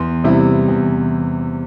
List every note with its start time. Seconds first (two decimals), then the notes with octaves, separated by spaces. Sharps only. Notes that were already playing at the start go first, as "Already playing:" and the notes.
Already playing: E2 C6
0.24 C3 G3 E4
0.68 E2